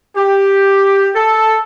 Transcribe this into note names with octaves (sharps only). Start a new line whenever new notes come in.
G4
A4